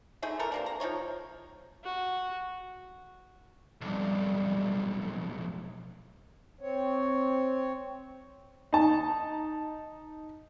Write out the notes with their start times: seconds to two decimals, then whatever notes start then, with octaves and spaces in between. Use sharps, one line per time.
0.22 D3 A3 D#4 G#4
0.39 E3 E4 A4 A#4
0.52 C3 A#3 D4
0.66 A#5
0.80 F3 G#3 D#4 C#5
1.84 F#4
3.81 B1 F2 G3
6.61 C4 C#5
8.73 D#4 A5